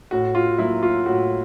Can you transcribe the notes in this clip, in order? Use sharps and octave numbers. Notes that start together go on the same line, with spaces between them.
A2 F#4
F4
F#3 A#3 E4
F4
A2 F#4